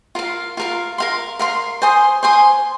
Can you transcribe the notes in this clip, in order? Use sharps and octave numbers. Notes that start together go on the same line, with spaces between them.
F4 A#4 F5
F4 A#4 F5
A#4 F5 C6
A#4 F5 C6
C5 G#5 C6 D#6
C5 G#5 C6 D#6